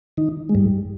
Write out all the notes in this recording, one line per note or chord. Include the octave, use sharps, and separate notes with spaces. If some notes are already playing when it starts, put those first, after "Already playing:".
D#3 D#4
G#3
G2 G3